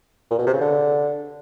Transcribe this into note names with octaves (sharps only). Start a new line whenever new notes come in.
A#2
B2
C3
C#3
D3